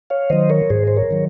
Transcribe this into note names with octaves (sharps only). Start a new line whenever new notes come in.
C#5 F5
D#3 F#3 C5 D#5
A#4 C#5
G#2 G#4 C5
C5
A#4 C#5
D#3 F#3